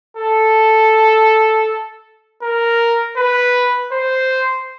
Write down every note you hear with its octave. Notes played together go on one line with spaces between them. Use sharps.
A4
A#4
B4
C5